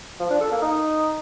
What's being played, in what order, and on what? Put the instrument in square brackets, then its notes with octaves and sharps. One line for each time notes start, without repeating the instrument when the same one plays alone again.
[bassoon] F3
D4
A4
A#3
D#4